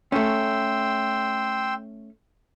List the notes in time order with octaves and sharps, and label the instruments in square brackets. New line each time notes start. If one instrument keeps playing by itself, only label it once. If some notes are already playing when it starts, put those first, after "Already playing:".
[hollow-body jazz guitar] A3 C#4 [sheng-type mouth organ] G5 C6 E6